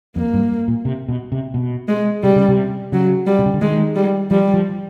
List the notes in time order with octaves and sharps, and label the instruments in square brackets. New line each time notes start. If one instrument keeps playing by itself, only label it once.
[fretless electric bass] F2 [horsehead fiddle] A#3
[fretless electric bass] G2
A#2
C3
B2
C3
B2
[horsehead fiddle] G#3
[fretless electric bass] C3 [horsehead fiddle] G3
[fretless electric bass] C#3
C3
[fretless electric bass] C#3 [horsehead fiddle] F#3
[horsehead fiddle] G3
[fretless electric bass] C3
C#3
D3
[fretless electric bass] D#3 [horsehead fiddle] G#3
[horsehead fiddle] G3
[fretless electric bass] F3 [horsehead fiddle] G3
[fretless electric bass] F3